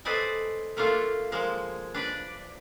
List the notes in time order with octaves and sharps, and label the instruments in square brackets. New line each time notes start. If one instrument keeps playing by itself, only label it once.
[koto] A4 B4 C5 D5 D#5 G#5
A3 A#3 D4 F4 A4
F3 G#3 A#3
D4 B4 D5